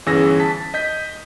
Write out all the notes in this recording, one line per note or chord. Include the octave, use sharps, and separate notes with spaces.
G1 E3 C#4 G#4 E6 A#6
A5 B6
D#5 G6 B6